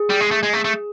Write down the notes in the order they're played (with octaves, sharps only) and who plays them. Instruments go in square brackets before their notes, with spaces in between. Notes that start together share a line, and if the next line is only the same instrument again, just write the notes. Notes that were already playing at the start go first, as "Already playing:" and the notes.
Already playing: [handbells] G#4
[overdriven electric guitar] G3
G#3
A3
G#3
A3
A3